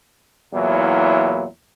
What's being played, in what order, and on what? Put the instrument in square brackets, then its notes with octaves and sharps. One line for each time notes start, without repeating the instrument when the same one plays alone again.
[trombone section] E2 A#2 F#3 E4